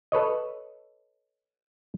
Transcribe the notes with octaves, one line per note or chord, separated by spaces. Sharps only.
A4 B4 C#5 D#5